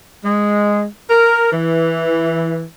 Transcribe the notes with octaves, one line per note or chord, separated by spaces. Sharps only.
G#3
A#4
E3